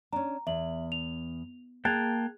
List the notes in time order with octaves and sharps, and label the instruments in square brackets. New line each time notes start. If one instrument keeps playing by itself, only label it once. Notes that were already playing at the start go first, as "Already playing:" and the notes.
[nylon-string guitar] C#4 D4 [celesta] A#5
[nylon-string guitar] E2 [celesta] E5 F#7
[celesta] F7
[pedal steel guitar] A#3 G5 A5 [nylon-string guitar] G#4 [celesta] F#6 G#6 F7